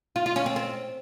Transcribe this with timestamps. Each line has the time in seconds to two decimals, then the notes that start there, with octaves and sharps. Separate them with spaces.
0.16 F4
0.26 F4
0.36 C#4
0.46 C4
0.56 C4